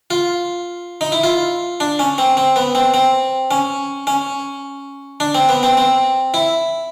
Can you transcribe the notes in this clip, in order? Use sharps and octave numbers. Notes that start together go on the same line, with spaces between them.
F4
D#4
E4
F4
D4
C#4
C4
C4
B3
C4
C4
C#4
C#4
D4
C4
B3
C4
C4
E4